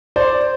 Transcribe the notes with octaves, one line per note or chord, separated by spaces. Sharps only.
C5 D5